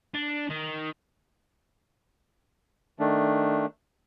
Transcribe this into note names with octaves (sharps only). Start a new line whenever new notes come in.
D4
D#3
D#3 A3 D4